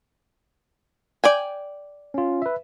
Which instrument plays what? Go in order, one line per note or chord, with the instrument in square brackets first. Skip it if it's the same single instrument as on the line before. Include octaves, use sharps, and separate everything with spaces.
[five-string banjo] D5 G5 G#5
[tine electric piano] C#4 F4
B4 E5